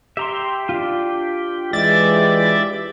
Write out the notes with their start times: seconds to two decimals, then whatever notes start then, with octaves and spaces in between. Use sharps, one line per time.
0.17 G4 E5 A#5 C6
0.69 D4 F4
1.73 E3 G#3 G4 D5 E5 A6